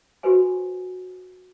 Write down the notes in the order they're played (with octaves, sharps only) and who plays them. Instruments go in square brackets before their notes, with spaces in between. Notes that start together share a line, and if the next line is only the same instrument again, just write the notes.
[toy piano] F#4 G4 A4 B4 C5 G#5